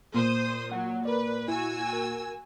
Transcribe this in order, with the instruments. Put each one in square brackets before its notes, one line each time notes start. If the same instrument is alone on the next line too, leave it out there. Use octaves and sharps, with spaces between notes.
[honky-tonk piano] A#2 [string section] C5 D#6
[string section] F#3 [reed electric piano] F#5
[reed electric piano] A#4 D5 [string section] B4
[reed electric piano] E4 [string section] F#4 G#5 E6
[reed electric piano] A#4